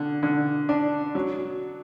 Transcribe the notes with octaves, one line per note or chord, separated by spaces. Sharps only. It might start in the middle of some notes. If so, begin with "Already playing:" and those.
Already playing: D3
D3
D4
F#3